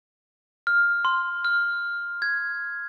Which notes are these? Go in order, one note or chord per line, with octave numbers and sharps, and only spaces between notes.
F6
C6
F6
G#6